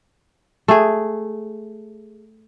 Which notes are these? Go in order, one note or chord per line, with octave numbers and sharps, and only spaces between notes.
A3 G#4